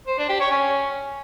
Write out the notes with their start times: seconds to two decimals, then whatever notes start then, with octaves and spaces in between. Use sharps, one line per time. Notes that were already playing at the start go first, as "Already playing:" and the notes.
0.07 C5
0.18 D4
0.29 G4
0.40 C#5
0.51 C#4